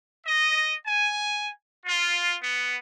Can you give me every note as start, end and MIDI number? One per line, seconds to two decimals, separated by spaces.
0.25 0.73 75
0.85 1.49 80
1.85 2.34 65
2.40 2.73 59